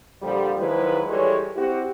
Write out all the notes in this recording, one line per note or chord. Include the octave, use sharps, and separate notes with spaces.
A#2 D3 F3 G3
D#3 F3 F#3 G#3 E4 B4
E3 G3 G#3 A4 C#5
C4 E4 F#4 G4